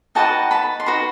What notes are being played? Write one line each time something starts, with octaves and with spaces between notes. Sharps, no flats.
D#4 F#4 B4 D#5 G5 A5
A5 B5
C6
D#4 F#4 B4 B5